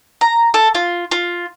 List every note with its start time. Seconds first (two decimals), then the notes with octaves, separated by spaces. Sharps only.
0.21 A#5
0.54 A4
0.75 F4
1.11 F4